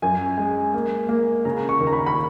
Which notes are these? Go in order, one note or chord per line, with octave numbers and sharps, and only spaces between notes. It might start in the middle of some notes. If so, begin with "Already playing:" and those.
F#2 G#5
G#3
A#3
A#3
C#3 A#5
C#6
D#2
A#5
B5
B5